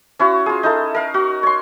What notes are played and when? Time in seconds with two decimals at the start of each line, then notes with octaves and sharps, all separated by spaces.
0.19 C#4 E4 F#4
0.46 F4 G#4
0.63 D#4 E4 A4
0.95 A#4 F5
1.14 F#4
1.43 C#5 C6